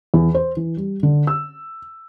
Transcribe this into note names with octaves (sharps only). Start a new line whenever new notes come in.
E2
C5
E3
G3
D3
E6